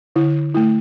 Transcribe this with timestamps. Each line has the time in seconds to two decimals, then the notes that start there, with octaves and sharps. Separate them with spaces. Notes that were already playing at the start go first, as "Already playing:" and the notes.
0.16 D3 E4
0.54 A3 E4